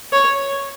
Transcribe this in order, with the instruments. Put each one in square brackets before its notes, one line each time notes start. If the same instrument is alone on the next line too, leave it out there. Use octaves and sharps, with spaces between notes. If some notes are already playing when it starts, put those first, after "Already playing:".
[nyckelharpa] C#5